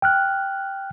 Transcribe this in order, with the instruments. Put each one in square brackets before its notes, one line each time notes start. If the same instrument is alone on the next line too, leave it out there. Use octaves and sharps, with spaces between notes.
[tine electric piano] G5 F6 F#6